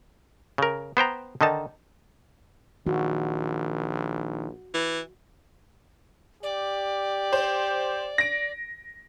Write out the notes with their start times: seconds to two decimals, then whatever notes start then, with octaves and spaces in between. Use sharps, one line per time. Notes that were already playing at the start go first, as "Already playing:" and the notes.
0.58 C#3 A#4
0.97 B3 C5 G5 A#5
1.41 D3 D#3 D#4 A5
2.86 A#1 D#3 F#4
4.74 E3
6.43 G4 D5
7.33 C5
8.18 A#6 D7